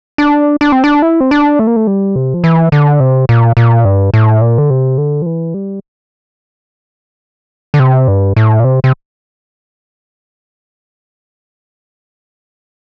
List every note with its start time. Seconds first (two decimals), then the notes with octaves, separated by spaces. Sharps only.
0.18 D4
0.61 D4
0.72 C4
0.84 D4
1.02 E4
1.20 C4
1.31 D4
1.59 A3
1.67 A#3
1.76 A3
1.87 G3
2.16 C3
2.34 F3
2.44 E3
2.72 D3
3.00 C3
3.29 A#2
3.57 A#2
3.85 G2
4.14 A2
4.41 A#2
4.58 D3
4.70 C3
4.98 D3
5.22 F3
5.26 E3
5.54 G3
7.74 D3
7.80 C3
8.08 G2
8.36 A2
8.60 A#2
8.64 C3
8.84 C3